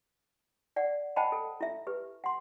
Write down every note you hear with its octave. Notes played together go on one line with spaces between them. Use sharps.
D5 F#5
C5 D#5 F#5 G5 A5 B5
A4
E4 E5
G4 B4
F#5 C6